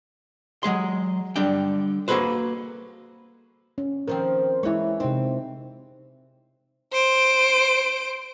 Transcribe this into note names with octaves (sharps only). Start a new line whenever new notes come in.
F#3 G#3 G#4 C6
D3 G3 D4 G5
A#3 F#4 G#4 A4 B4 C5
C#4
D#3 F3 C4 A#4 C5
E3 G#3 E4 C#5
C3 C4 D#4
C5 D7